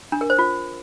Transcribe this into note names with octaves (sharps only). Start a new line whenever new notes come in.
D4
A#4
C5
F4